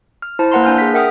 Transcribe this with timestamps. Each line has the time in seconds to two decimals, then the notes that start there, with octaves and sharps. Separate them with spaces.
0.22 F6
0.39 E4 C5 A5
0.52 A#3 B4 F#5 A#5 C6
0.64 D4 G#5 F6 G6
0.78 G#4 B6
0.94 A#4 E5 F#5 G5 D#6 F6